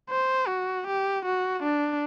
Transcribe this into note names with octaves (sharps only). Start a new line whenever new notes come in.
C5
F#4
G4
F#4
D4